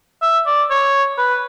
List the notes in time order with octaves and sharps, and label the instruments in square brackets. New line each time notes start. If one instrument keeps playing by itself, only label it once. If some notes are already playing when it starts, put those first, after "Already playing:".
[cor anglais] E5
D5
C#5
B4